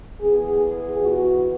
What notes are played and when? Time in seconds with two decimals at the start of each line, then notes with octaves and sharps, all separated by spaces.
0.21 E3 B3 G#4
0.61 G#4
0.99 F#4